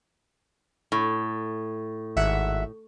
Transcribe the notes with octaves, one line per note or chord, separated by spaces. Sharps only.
A2
G#1 E5 F#5